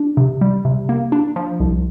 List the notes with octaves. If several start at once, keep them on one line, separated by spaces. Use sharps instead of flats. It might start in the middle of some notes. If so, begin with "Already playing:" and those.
Already playing: D4
C3
G3
C3
A#3
D4
F3
C2